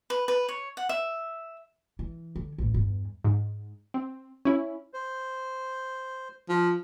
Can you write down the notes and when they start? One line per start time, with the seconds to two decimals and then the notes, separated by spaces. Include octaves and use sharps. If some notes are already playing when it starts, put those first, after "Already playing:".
0.10 B4
0.28 B4
0.49 C#5
0.77 F#5
0.89 E5
1.99 E3
2.36 D3
2.58 A1 A3
2.74 E2 G2
3.25 G#2
3.94 C4
4.45 C#4 E4
4.94 C5
6.49 F3